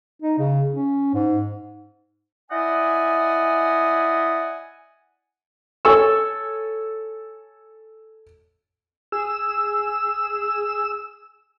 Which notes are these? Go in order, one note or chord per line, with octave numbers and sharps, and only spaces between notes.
D#4
C#3
C#4
G#2
E4 D5 D#5 F#5 G#5
A4 C#5 G#5 C#6 E6
G#4 E6